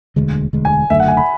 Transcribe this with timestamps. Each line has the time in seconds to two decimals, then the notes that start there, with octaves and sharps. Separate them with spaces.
0.16 E1 D2 D3 G#3
0.53 E1 D2 D3 G#3
0.65 G#5
0.90 F#1 F#2 D3 A3 E5
1.00 F#5
1.08 G#5
1.17 B5